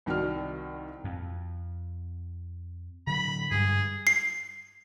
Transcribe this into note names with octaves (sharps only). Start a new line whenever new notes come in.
C2 D#3 F#4 D5 F6
F2
D3 F#3 B5
G2 G3 G#3 G#4
C7